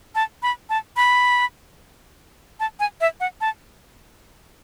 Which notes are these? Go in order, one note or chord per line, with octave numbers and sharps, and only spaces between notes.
A5
B5
A5
B5
A5
G#5
E5
F#5
A5